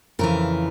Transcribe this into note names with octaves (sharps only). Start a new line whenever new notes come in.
F2 C#3 E3 A#4